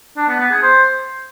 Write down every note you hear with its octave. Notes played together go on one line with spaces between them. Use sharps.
D4
B3
B3
G#4
C5